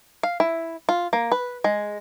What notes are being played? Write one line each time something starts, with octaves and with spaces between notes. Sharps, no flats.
F5
E4
F4
A#3
B4
G#3